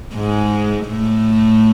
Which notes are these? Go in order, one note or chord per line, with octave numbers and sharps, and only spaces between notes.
G#2 G#3
A2 A3